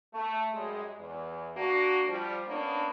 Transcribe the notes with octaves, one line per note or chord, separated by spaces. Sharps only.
A3
F#2 G3 G#3
E2
A#3 D4 F#4
F3 G3
A#3 B3 C#4 D4